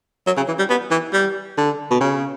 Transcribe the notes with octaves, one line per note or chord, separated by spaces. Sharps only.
F#3
C#3
E3
G3
B3
E3
G3
D3
B2
C#3